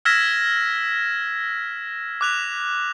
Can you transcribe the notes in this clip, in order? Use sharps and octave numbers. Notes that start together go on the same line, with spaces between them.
E6 F6 G#6 A#6 B6 E7
D6 F#6 F7